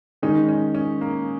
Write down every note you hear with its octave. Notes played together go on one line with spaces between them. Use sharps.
D#3 G#3 C#4 D#4
C#4
C#4
A#3